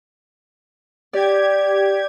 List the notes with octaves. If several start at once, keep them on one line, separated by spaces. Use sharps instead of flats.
G4 D5 G#6